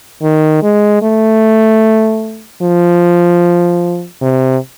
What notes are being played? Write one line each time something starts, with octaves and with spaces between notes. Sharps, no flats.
D#3
G#3
A3
F3
C3